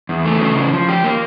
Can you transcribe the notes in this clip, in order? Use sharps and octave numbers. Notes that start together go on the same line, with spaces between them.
E2
A3
C#3
E3
F3
G4
A#3